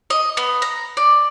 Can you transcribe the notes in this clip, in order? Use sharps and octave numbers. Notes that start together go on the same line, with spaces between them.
D#5
B3
A#5
D5